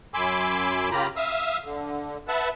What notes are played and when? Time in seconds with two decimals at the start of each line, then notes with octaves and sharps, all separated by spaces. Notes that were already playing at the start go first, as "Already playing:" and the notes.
0.14 F#2 G#5 B5 C6 D6 E6
0.91 C#3 A#3 F4 G4 A#5 B5
1.16 E5 F5 D#6 E6
1.64 D3
2.28 B4 E5 F#5 A5